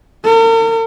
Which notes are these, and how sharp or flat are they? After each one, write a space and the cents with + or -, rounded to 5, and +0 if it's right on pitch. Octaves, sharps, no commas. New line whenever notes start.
A#4 -45